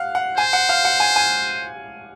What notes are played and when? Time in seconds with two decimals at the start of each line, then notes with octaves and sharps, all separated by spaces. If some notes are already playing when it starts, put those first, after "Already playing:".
Already playing: F5 F#5
0.15 F#5
0.38 C5 G#5
0.53 F#5
0.69 F5
0.85 F#5
1.00 G#5
1.16 G#5